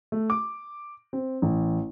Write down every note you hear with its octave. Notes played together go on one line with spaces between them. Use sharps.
A3
D6
C4
A1